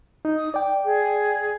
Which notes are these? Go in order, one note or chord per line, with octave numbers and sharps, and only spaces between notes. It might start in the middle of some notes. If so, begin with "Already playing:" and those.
D#4
D#6
D5 G5 D6
G#4